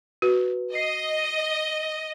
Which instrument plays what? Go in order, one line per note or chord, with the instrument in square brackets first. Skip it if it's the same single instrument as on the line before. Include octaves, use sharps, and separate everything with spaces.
[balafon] F#4 [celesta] B4
[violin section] D#5 [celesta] C7